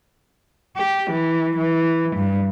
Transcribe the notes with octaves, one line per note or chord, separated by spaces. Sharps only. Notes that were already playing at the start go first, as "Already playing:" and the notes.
G4
E3
E3
G2